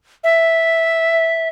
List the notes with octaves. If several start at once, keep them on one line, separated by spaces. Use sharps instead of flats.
E5